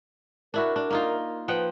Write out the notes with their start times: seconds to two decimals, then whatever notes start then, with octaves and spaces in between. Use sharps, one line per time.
0.54 D4 E4 F#4 A#4
0.76 D4
0.91 A#3 D#4 F4
1.48 F3 B4 F#5 G5